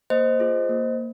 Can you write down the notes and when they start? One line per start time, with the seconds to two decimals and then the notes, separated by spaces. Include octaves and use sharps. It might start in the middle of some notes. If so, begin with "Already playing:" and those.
0.10 A#3 C5 D#5
0.40 F4 G#4
0.69 A#3